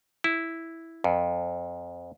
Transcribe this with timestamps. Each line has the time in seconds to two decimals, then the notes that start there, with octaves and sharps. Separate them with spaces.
0.24 E4
1.04 F2